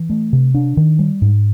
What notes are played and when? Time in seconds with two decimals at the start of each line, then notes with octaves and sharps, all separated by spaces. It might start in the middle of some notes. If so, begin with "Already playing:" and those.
Already playing: E3
0.10 A3
0.33 C3
0.54 D4
0.77 D#3
0.99 G3
1.22 G#2